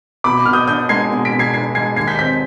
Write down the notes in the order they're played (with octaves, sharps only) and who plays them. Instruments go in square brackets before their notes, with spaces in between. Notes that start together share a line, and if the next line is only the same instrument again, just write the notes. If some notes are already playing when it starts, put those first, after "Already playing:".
[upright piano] B2 B5 D6
B2 F6
D#6 G6
D4 D#6 G6
G#3 G#6 C7
B2
B6 D7
B2
G#6 C7
D4 G#6 C7
G#3 G#6 C7
D#2 G#6 C7
G6 B6
C4 G6 B6